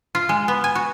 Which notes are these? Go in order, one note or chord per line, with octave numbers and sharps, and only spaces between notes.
F4
G#3
B3
G#5
F#4